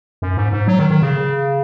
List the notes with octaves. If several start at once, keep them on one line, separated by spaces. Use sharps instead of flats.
F#2
G#2
G#2
F#3
D#3
D#3
C#3